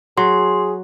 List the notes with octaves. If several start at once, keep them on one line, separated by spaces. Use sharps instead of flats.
F#3 G#4 C6